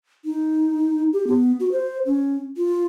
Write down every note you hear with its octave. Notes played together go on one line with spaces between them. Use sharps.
D#4
G4
B3
F#4
C5
C#4
F4